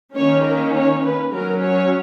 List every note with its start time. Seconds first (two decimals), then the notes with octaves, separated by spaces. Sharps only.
0.15 D#3 A#3 C#4 C#5
0.44 A#4
0.74 C#5
1.03 B4
1.32 F#3 C#4 A#4
1.62 C#5